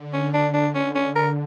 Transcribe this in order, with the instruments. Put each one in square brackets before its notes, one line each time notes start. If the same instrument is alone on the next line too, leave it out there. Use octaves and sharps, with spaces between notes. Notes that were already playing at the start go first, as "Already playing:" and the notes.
Already playing: [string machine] D3
[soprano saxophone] C#4
D4
D4
C#4
C#4
A#4